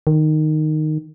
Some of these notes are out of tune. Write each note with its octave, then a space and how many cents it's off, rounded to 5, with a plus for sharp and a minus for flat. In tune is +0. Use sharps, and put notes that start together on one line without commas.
D#3 -10